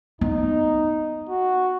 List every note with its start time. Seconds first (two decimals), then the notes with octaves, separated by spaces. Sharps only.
0.21 B3 D#4
1.29 F#4